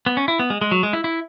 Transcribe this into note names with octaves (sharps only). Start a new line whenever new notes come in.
B3
C#4
E4
B3
G#3
G#3
F#3
G#3
E4
E4